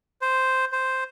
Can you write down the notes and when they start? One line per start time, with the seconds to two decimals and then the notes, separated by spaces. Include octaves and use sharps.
0.22 C5
0.72 C5